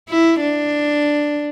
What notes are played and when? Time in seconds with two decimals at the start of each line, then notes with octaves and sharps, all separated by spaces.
0.09 E4
0.41 D4